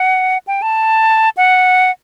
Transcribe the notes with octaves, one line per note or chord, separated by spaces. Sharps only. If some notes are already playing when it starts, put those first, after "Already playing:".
Already playing: F#5
G5
A5
F#5